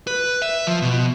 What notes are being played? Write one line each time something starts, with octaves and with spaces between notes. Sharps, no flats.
B4
E5
F3
B2